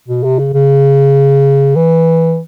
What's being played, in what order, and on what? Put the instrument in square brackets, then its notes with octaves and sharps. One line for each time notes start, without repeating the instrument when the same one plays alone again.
[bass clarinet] B2
C3
C#3
C#3
E3